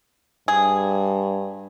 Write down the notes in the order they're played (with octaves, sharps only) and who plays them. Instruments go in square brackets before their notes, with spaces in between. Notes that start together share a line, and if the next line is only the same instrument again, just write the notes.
[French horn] G2 [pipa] G#4